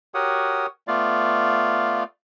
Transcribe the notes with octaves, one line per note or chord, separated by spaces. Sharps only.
F#4 G4 A#4 C#5 F#5 D#6
A3 B3 F4 D5 F5